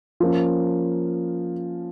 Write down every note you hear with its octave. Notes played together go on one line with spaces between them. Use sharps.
F3 A#3 C#4